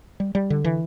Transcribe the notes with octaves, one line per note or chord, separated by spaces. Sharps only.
G3
G3
D3
E3